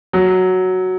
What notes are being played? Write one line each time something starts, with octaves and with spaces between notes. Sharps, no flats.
F#3